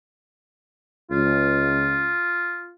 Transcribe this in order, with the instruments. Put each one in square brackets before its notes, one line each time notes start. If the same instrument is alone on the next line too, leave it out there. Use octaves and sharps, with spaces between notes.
[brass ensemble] C#2 [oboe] F4